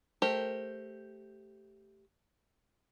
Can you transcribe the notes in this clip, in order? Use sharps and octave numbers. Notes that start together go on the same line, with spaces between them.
A3 G4 A#4 C5